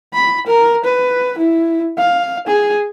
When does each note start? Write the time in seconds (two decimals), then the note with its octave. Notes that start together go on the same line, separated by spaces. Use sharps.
0.14 B5
0.47 A#4
0.85 B4
1.39 E4
1.98 F5
2.48 G#4